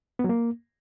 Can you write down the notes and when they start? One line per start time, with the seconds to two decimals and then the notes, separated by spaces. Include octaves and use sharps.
0.19 B3
0.24 F#3
0.29 A#3